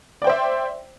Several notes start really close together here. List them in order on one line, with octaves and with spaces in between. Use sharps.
D5 G5 C5 E5